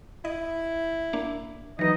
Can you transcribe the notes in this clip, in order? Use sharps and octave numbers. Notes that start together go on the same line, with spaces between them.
E4 D#5
A#3 D4
E3 F#3 B3 D#4 D#5